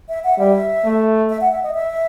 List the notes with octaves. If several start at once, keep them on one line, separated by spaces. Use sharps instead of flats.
E5
F#5
G3 E5
A3
E5
F#5
E5
D#5
E5